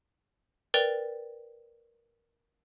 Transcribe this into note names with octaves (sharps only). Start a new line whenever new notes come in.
A#4 B4 D5 G5 A6 F7